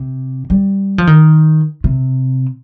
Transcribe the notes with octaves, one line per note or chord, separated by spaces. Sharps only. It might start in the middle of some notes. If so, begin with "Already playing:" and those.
Already playing: C3
G3
F3
D#3
C3